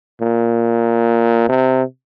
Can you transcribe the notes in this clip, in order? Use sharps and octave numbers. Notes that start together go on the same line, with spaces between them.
A#2
C3